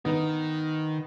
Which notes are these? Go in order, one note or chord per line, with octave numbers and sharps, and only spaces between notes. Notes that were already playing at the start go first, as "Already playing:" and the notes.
D#3 B3 D#4